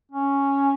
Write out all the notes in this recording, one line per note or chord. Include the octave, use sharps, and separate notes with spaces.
C#4